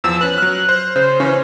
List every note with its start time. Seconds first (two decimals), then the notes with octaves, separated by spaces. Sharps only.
0.04 E2 F3 E6
0.21 C#4 B4 F#6
0.38 F#3 F6
0.69 C5
0.96 C#3 C5
1.20 C#3 E3 C#4